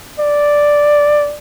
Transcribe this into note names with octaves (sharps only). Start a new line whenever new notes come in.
D5